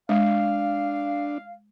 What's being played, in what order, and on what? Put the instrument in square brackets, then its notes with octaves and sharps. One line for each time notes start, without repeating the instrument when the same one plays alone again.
[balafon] G#3 [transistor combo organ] D4 [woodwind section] F5